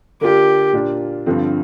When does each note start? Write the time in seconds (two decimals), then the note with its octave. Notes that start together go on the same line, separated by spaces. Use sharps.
0.21 D3 A#3 D4 F4 G4
0.73 A#2 A#3 D4 F4
1.26 G2 D3 F3 C4